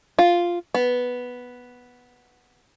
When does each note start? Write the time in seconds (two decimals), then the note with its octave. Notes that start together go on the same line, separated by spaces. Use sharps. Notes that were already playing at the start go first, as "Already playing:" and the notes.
0.19 F4
0.75 B3